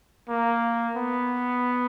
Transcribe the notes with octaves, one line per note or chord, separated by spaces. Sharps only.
A#3
B3